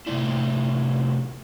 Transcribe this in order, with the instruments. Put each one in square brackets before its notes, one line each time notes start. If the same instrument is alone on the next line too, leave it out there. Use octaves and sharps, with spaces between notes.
[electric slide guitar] A2 C3 A3 D4 E4